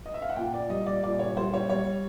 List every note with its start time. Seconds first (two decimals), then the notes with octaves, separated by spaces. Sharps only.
0.06 D#5
0.14 E5
0.22 F5
0.29 F#5
0.36 A#2 G5
0.54 D5
0.69 G3 D#5
0.86 D5
1.04 A#2 D5
1.19 C#5
1.36 G3 C5
1.54 C#5
1.69 G3 C#5